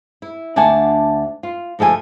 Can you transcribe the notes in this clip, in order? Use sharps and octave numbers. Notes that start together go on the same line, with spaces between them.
E4
D2 D4 F#5 G#5 A5
F4
D2 F3 A4 E5 G#5